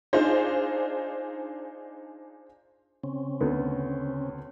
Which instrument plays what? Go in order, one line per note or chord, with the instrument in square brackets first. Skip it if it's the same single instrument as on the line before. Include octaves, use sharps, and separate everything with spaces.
[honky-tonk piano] D4 D#4 F4 G#4 C5
[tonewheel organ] C#3 C4 C#4
[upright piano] D2 B3